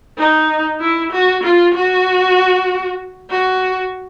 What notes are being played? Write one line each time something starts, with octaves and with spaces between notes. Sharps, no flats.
D#4
E4
F#4
F4
F#4
F#4